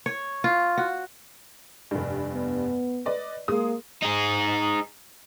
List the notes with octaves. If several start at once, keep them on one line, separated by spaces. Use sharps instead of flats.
C#5
F4
F#4
F1 G2
B3
B4 D5 D#5
G#3 A#3 D#6
D#4 G#4